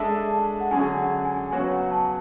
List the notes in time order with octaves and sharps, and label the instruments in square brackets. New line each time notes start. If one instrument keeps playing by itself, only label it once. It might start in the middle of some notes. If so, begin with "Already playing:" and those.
Already playing: [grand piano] G#3 D4 A4 E5 [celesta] A5
[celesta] A5
F#5
[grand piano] D3 F#3 C#4 G#4 [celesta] G#5
[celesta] F#5
G#5
[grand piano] C#3 F#3 B3 F#4 C#5 [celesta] G#5
[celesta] F#5
A5